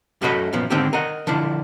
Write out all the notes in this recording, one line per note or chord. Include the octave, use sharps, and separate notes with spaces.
F#2 A3 F#4 D#5 B5
F#2 A#2 F3 B3
G#2 D3 D#3 C4 G4
A#4 D#5 F#5
D3 F3 D4 E4